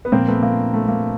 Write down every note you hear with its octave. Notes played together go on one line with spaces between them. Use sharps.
B3
A#2 F3 A#3 C4
A3 B3
A#3
A3
A#3